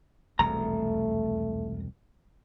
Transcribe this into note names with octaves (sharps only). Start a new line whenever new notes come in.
E1 C2 F2 A3 A#5